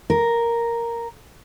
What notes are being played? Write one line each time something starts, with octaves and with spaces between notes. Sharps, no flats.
A#4